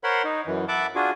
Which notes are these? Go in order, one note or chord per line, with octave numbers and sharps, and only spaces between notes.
A#4 C5 C#5 F#5 B5 C6
D#4
F#2 E3
E5 F#5 A5 B5 D6
D4 F4 F#4 G#4